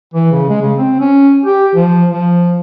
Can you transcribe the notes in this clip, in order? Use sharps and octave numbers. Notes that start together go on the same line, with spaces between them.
E3
C#3
G#3
C#3
C4
C#4
G4
F3
F3